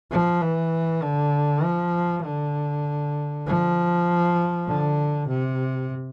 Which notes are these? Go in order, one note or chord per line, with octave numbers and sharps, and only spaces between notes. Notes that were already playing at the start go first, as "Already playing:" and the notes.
F3
E3
D3
F3
D3
F3
D3
C3